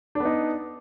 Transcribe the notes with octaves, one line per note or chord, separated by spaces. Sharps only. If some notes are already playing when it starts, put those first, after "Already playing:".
B3 D4 D#4